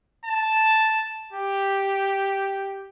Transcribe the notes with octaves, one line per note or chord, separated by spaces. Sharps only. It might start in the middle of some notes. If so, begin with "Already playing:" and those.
A5
G4